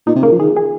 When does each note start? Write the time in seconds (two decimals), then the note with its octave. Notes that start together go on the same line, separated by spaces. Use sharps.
0.07 A#2 D#4
0.15 C3
0.23 C#3 A#3
0.32 F3
0.39 D#3 G#4
0.57 G#4